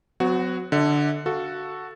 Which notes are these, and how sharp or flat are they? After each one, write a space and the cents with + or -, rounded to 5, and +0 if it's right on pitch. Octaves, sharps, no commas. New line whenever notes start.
F#3 -15 B3 +45 F#4 +0
D3 +0 E5 -40
F#4 +0 A4 +0 F5 -10